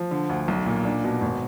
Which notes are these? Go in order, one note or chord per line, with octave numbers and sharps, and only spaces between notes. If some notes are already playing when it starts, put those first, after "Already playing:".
Already playing: F3
D3
D2
B1
A#2
D4
B2
G#1